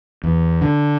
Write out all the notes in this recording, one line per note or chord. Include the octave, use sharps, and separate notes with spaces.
E2
D3